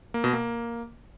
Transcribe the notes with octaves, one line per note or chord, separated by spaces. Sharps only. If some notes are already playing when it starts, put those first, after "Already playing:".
A#3
B2
A#3